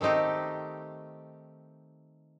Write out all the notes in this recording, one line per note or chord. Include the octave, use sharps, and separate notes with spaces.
D#3 A3 C4 D#4 G4